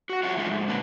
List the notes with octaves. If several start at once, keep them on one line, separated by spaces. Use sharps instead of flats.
F#4 F#5
F#3 F4 E5 F#5
F2 G#3 D#4 F4 A4 E5
G#2
A#2 D3 A#3 D4 B4